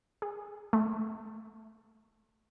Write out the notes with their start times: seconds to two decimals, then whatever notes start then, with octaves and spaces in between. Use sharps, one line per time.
0.22 G#4
0.73 A3